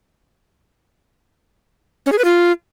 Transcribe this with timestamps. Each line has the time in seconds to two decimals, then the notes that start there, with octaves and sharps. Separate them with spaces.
2.06 C#4
2.12 G#4
2.18 B4
2.25 F4